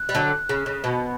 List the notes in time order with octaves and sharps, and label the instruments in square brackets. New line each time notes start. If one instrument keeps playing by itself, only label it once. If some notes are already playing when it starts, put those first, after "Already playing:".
Already playing: [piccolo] F#6
[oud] G3
D3 F#3
C#3
C#3
B2